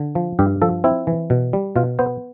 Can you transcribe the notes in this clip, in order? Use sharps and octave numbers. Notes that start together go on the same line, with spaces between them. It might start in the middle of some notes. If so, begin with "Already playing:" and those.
Already playing: D3
F3
G2 G4
F3 A4
C4 E4
E3
B2
G3
B2 F4
B3 C5